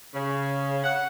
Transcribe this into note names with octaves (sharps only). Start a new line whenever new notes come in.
C#3
F#5